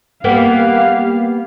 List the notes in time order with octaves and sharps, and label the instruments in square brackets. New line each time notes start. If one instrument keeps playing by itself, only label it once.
[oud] G3 A#3 B3 [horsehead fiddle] G4 F5